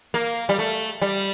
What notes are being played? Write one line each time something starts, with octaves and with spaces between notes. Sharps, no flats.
A#3
G3
A3
G3